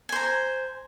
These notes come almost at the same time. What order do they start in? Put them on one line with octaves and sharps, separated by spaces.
G#5 C5 A#5